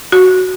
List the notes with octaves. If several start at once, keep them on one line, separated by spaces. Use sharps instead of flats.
F#4